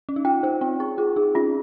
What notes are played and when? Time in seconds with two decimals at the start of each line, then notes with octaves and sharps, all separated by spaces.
0.09 C#4
0.16 D#4
0.25 F4 G5
0.43 D#4 C5
0.61 C4 G5
0.80 G#4 C#6
0.98 F4 G#4
1.16 D#4 G#4
1.35 C#4 F4